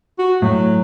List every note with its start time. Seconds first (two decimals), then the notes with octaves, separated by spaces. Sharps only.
0.19 F#4
0.42 A2 F#3